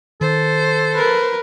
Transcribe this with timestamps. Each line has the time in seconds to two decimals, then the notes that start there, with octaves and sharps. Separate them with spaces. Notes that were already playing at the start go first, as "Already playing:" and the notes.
0.21 D#3 A4 C5
0.94 A#4 B4